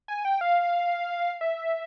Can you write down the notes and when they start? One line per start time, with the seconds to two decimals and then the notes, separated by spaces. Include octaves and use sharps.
0.08 G#5
0.25 G5
0.41 F5
1.41 E5